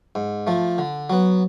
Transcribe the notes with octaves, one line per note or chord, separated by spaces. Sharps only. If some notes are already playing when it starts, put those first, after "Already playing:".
G#2
F3 A3
D3
F#3 B3